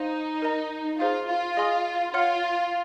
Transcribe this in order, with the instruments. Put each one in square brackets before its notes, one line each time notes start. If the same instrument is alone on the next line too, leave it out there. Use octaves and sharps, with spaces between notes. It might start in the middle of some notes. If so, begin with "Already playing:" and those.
Already playing: [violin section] D#4 [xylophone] C5 F5 C6
[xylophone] A#4 D#5 A#5
[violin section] F4 [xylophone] G#4 C5 F5 C6
[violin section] F4
[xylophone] G#4 D#5 G#5 C6 D#6
[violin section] F4 [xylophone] C#5 F#5 C6 F6